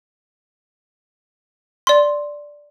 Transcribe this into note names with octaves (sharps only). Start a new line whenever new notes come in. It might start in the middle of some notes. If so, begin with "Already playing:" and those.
D5 C6